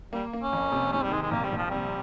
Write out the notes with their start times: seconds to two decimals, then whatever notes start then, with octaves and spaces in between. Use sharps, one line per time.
0.13 G3 A#3
0.33 A#3
0.42 C#4
0.53 F2
0.72 C3
0.92 G#2 C#4
1.03 G3
1.11 D#3 G#3
1.22 G#3
1.31 A#1 A#3
1.44 G3
1.52 A#1
1.58 F3
1.71 C3 G3